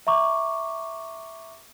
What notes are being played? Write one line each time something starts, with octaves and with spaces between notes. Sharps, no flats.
E5 A#5 C#6 D6